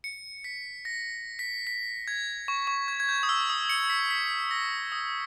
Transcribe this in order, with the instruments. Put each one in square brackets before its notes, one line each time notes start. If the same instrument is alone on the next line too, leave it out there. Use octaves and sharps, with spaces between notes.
[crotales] C#7
B6
A#6
B6
B6
G#6
C#6
C#6
G#6
G#6
G6
D#6
E6
D#6
C#7
B6
B6
A#6
D#6